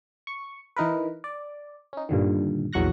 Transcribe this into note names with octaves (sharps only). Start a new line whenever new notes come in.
C#6
E3 D#4 A#4 B4
D5
C#4 D#4
G2 A#2 D3 D#3
A#1 E2 F#3 C#6 F#6 A#6